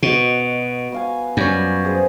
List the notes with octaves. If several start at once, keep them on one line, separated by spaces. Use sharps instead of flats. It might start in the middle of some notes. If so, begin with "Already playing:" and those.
B2 F#4 D#5
B3 F5 G#5
F#2 G3 C#4
G#4 C5